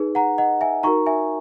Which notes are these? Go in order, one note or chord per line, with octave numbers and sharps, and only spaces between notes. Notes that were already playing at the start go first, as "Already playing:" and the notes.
Already playing: D#4 G#4 B4
F#5 A#5
D#5 F#5
E5 G#5
D#4 F#4 A#4 A#5 C#6
E5 G#5